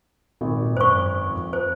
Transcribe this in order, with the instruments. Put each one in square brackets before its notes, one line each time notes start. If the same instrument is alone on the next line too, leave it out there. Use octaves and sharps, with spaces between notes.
[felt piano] G#1 [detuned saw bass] A#2
[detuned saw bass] F#2 [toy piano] C5 C#6
[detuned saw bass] F2
[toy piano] C5